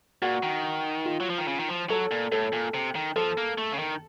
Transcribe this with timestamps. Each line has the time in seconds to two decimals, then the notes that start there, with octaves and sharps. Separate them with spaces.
0.22 A#2 F#4
0.43 D#3
1.05 F4
1.20 F#3
1.30 F3
1.38 D#3
1.48 C#3
1.59 D#3
1.69 F3
1.90 F#3 A4
2.11 A#2
2.32 A2 A4
2.53 A#2
2.74 C3
2.95 D#3
3.16 F3 A4
3.37 A#3
3.58 A3
3.72 C#3
3.79 D#3